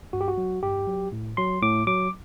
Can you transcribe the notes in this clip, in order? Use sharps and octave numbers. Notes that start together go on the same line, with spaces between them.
G2 F#4
G4
F#4
F#3
G2 G4
F#3
A2
F#3 C6
A2 D6
F#3 D6